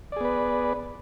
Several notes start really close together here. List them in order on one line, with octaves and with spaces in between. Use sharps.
D5 G#4 B3 B4